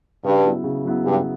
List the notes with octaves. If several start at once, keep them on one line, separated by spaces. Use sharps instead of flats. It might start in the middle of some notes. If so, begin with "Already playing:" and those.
G2 C#3
F#3 B3 E4
C#3
F#3 B3 E4
G2 C#3